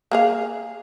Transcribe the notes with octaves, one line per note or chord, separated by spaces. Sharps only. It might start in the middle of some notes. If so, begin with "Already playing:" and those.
A#3 G#4 F5